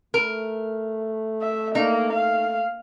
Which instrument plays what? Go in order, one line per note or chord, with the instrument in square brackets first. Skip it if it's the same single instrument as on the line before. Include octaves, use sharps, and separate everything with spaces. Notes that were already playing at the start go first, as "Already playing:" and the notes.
[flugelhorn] A3 [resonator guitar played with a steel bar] A#4
[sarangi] E5
[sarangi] A#3 [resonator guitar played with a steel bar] D#4
[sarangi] F5